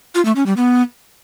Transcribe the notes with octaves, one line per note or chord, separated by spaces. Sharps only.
F4
A3
C#4
G3
B3